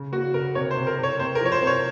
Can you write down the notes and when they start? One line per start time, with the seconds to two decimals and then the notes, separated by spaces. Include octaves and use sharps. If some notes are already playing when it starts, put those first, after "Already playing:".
Already playing: C#3
0.12 A#3 F#4
0.34 C#3 A#4
0.55 C3 C#5
0.71 C5
0.77 C3
0.87 A#4
0.98 C3 C#5
1.19 C3 C5
1.35 A#4
1.41 F3 C#5
1.52 C5
1.62 C3
1.67 C#5